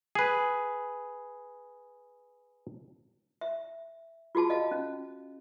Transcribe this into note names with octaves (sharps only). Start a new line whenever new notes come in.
G#4 B4
E5
F4 F#4 G#4 A5
D#5 F5
C#4